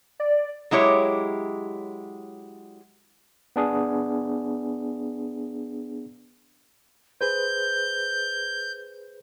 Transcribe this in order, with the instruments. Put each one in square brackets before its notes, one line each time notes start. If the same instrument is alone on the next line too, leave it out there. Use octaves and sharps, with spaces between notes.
[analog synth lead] D5
[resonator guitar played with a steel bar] F#3 G#3 E4 G4 C#5
[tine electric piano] B3 D4 G#4
[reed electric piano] G#4 B4 C5 [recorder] G6